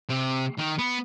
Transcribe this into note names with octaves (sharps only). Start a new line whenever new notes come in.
C3
D#3
B3